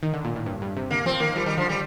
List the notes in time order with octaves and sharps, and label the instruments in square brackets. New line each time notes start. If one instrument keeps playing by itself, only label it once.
[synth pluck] D#3
D3
A#2
A2
G2
G2
C3
[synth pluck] D3 [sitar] A#3
[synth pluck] F3 [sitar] C4
[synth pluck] D#3 [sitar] A#3
[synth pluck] F3 [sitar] G3
[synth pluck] D#3 [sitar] G3
[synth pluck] D3 [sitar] F3
[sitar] G3